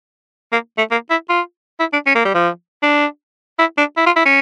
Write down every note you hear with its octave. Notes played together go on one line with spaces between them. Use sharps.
A#3
A3
A#3
E4
F4
E4
D4
C#4
A#3
G3
F3
D4
E4
D4
E4
F4
E4
C#4